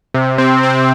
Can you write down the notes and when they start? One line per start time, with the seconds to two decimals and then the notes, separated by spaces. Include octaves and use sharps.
0.14 C3
0.38 C4
0.63 C4